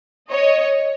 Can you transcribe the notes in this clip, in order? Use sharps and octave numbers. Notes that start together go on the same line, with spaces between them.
C#5 D#5